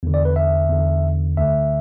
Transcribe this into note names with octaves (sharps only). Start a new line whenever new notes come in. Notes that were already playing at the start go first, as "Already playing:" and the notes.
E2 D3
D5
B4
E5
E2 D3
D2 D3 E5